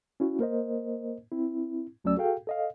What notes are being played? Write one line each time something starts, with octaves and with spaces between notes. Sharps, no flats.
C#4 E4 F#4
A#3 A#4 C5 D#5
C4 E4
D2 F#3 A3 C#4 D5 E6
F#4 G#4 A4 F5 G5
A4 D#5 F5